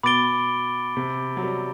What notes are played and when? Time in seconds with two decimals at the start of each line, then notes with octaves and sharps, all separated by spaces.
0.03 B2 B5 D6 A6 D7 G7
0.97 C3
1.37 F#3
1.43 G3